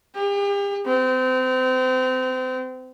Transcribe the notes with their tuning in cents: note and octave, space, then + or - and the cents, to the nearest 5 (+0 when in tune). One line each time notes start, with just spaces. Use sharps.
G4 +40
C4 -30